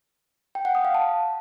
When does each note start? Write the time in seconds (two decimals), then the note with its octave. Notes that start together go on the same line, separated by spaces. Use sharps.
0.55 G5
0.65 F#5
0.75 D#6
0.85 F5
0.94 A5